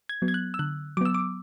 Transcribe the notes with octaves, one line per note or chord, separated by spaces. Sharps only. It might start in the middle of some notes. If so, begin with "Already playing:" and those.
G#6
F#3 B3
G#6
F#6
E6
D3 F#6
F#3 B3 D6 E6
D6